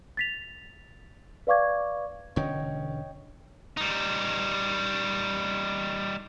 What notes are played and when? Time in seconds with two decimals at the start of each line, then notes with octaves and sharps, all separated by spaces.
0.17 A6 B6 F7
1.47 B4 D5 F5 C#6 D6 G#6
2.36 E1 D3 C#4 C#5 D#5 G5
3.77 G3 D#4